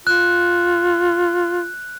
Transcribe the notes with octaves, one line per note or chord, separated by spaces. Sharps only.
F4 F#6